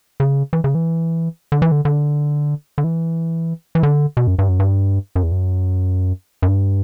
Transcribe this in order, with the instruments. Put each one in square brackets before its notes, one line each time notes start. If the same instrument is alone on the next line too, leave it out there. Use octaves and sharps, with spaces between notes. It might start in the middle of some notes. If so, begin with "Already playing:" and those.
[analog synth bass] C#3
E3
C#3
E3
D3
E3
D3
D3
D3
E3
E3
D3
B2
F#2
G2
F#2
G2
F#2
E2
F#2
F#2
G2